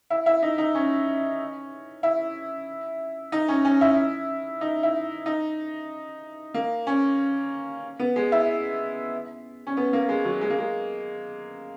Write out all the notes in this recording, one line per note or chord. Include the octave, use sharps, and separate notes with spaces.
E4
E4
D#4
D#4
C#4
E4
D#4
C#4
C#4
E4
D#4
E4
D#4
A#3
C#4
B3
G#3
E4
C#4
B3
A#3
G#3
F#3
G#3
A#3
G#3